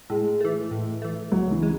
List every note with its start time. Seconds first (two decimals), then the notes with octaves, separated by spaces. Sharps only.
0.10 A2 G#3
0.41 E3 A3
0.71 A2
1.02 E3 A3
1.32 C#2 F#3
1.51 E3
1.62 C#3 G#3